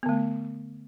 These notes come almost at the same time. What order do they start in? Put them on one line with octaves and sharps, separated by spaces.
B3 D3 A3